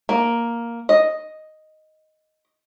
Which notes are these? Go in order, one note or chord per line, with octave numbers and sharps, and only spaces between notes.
A#3
D#5